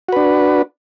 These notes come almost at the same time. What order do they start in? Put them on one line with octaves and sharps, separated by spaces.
F#4 B4 D4